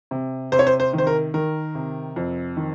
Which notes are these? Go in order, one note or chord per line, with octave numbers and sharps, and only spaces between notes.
C3
C3 C5
C#5
C5
C5
D#3
C5
A#4
D#3 A#4
C3
F2
D#3